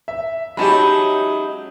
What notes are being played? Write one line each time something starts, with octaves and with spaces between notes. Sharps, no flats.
E5
F#3 G#3 C#4 D#4 F#4 G4 A5 B5